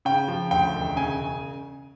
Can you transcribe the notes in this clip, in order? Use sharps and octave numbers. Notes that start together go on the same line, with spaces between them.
C#3 G5
F3
D2 G5
E1
C#3 G#5